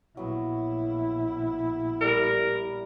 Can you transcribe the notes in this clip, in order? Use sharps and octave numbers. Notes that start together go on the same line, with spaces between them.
A#1 F#3 B3 E4
G3 A#4